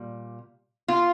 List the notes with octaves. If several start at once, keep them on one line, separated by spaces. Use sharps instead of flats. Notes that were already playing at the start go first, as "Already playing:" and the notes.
Already playing: A#2 G3
F4